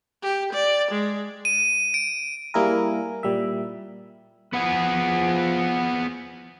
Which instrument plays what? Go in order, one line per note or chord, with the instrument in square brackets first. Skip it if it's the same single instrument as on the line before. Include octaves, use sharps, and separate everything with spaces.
[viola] G4
D5
G#3
[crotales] D#7
D7
[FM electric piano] G3 A#3 E4 G#4 A#4
A#2 G3 E5
[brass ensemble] F3 [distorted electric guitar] B3 G#4 [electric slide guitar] B4 F#5